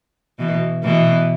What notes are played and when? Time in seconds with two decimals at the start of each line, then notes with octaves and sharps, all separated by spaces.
0.39 B2 E3
0.83 B2 E3